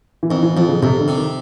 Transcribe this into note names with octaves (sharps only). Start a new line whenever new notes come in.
E3
F2 D#3
E3
F2 F3
C#3
F2 C3
D3
C3
D#3